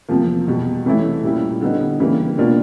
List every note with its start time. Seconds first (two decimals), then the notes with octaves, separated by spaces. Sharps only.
0.09 E2 C3 F3 A#3
0.47 E2 B2 G3
0.85 C3 E3 A3 C#4 E4
1.24 A#2 G3 A#3 C#4 E4
1.61 D3 G3 B3 D#4
2.00 C#3 E3 G3 A#3
2.38 B2 G3 A#3 D4 F4